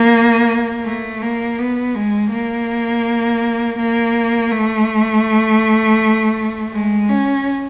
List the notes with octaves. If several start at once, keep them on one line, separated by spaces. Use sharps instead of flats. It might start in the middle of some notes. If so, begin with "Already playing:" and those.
Already playing: A#3
A3
A#3
B3
G#3
A#3
A#3
A3
G#3
C#4